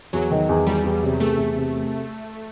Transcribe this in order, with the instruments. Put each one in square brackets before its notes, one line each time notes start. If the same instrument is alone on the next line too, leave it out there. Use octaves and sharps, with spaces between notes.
[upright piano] E2 [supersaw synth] F#3
[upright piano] D#3
E2
[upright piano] E2 [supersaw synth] G3
[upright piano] E2
C3
[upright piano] E2 [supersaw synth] A3
[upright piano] E2
C3